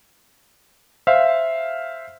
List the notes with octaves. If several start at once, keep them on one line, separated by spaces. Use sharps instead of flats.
C5 E5 F5